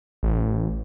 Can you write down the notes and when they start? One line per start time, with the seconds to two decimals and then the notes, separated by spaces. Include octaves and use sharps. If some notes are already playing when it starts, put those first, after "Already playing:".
0.23 A1